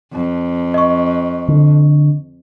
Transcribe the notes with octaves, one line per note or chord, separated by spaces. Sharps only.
F2
D#5 C#6
D3